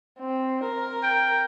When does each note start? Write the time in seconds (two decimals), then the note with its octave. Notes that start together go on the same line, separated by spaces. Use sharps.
0.19 C4
0.64 A#4
1.03 G5